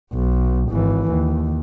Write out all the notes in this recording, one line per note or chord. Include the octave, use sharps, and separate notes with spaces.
B1
G#1 E3
D#2